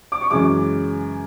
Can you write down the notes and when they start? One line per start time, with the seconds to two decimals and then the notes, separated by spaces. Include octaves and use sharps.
0.12 D6
0.21 C#6
0.30 F#2 C#3 E3 G#3 D6